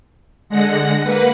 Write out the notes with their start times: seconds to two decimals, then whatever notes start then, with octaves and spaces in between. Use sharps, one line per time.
0.49 D3 G#3 F#5 A#6
1.01 A#3 B4 F#5